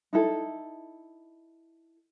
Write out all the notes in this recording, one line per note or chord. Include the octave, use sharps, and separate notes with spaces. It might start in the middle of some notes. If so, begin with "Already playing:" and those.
D#4 E4 A4